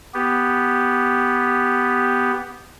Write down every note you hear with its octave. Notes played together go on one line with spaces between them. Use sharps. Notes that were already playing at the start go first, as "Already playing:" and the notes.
B3 G4